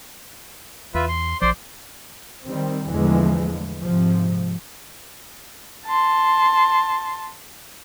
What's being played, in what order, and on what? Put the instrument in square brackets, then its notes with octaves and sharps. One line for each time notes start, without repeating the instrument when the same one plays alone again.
[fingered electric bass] E2 [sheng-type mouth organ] F4 B4 E5
[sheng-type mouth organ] C6
[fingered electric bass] A#1 F3 [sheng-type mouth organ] C5 D5 C6
[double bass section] D#3 G3 C4
E2 A2 D3 E3 F3 G#3
G#2 C3 F3
[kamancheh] A5 C6